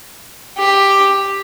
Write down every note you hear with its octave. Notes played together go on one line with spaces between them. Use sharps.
G4